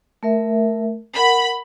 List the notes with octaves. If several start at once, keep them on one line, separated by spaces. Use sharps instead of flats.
A3 A#4 E5
A#4 F#5 B5